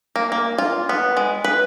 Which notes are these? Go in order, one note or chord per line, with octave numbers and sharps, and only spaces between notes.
A#3
A#3
F4
B3
G#3
B4